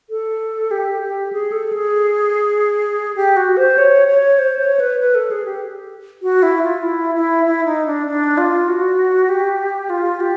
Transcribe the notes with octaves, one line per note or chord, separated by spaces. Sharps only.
A4
G4
G4
G#4
A4
G#4
G4
F#4
C5
C#5
C#5
C5
C#5
B4
B4
A4
G#4
G4
F#4
E4
F4
E4
E4
E4
D#4
D4
D4
F4
F#4
G4
F4
G4